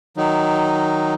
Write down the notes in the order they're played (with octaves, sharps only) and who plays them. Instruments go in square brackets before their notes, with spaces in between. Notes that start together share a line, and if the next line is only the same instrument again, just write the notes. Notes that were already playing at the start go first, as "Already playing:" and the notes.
[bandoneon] D#3 F#3 D#4